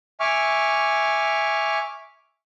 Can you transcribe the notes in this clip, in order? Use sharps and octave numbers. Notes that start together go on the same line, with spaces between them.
E5 G#5 C#6 D6 F6